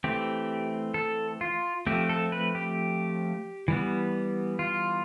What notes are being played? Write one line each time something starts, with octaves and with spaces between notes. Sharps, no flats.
E3 A3 C4 G4
A4
F4
F3 A3 C4 G4
A4
B4
G4
E3 G3 B3
F4